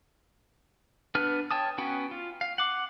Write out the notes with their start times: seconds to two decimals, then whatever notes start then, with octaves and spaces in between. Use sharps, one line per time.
1.15 B3 D4 B4 F6
1.51 C#5 G5 A5 D#6
1.78 B3 C#4 F#4 G5
2.11 F4
2.41 F5
2.58 F#5 D6